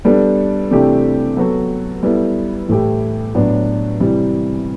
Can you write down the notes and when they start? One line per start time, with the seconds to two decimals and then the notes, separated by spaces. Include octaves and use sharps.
0.05 G3 B3 D4 A4
0.71 C3 E3 A3 D4 G4
1.37 F#3 B3 F#4 A4
2.03 G3 B3 E4 A4
2.68 A2 E3 A3 E4 G4
3.35 A2 F#3 B3 D4
4.00 C3 E3 G3